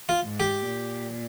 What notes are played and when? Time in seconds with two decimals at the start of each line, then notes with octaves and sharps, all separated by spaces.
0.09 F4
0.24 G#2
0.40 G4
0.71 A#2